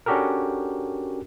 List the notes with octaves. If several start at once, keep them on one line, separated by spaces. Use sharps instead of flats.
C#4 D4 F#4 G4 A4 A#4